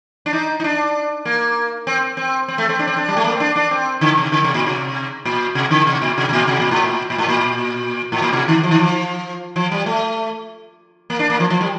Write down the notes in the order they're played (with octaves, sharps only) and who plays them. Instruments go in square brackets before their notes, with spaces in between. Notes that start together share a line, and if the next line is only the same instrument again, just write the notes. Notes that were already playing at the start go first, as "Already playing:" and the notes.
[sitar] D4
D#4
D#4
D4
A#3
C4
C4
C4
A3
C4
D4
C4
D4
G3
A3
A#3
C4
D4
D4
C4
D3
C3
D3
C3
A#2
C3
A#2
C3
D3
C3
A#2
C3
C3
A#2
C3
A#2
A2
A#2
A#2
A2
A#2
A2
A#2
C3
D#3
F3
D#3
F3
F3
G3
A3
A#3
D4
A#3
F3
F3
G3